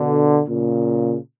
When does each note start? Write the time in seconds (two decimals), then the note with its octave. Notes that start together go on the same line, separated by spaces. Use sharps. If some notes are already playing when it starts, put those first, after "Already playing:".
Already playing: B2 D3
0.48 A#2 C#3